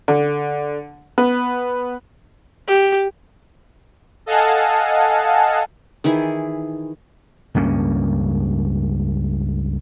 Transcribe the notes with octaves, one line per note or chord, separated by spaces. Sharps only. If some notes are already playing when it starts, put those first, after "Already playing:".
D3
B3
G4
A4 D#5 F5 F#5 G#5 A5
D#3 E3 E4 G#4
C#2 G2 A#3 C#4